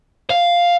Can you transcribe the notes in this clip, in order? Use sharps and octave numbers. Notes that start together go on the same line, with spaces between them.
F5